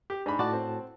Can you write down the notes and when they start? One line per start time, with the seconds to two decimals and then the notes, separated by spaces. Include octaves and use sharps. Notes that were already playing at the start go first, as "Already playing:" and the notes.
0.10 G4
0.26 G#2 D4 B5
0.39 A2 F#4 D5 A5
0.53 C4